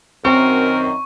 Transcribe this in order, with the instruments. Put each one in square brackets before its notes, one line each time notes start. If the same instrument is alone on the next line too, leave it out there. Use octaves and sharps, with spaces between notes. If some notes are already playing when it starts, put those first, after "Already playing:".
[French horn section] F#2 D#3 [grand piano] C4 [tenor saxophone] A#4 [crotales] C#6